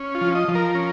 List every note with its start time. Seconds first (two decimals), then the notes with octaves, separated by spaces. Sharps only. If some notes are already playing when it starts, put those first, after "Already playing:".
Already playing: C#4
0.15 F4
0.21 F3
0.35 D#5
0.48 F3
0.55 A#4
0.75 C#4